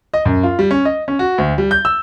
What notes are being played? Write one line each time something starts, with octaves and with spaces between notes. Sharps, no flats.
D#5
F#2
F4
G3
C#4
D#5
C#4
F#4
D2
G3
G6
E6